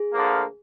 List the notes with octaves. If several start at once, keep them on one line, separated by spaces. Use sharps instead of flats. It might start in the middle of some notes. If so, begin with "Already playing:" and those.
Already playing: G#4
D2 D3 F3 A#3